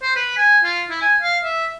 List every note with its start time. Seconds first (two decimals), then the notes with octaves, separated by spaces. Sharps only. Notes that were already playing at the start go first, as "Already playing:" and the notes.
0.02 C5
0.16 B4
0.37 G#5
0.64 F4
0.90 E4
1.02 G#5
1.22 F5
1.44 E5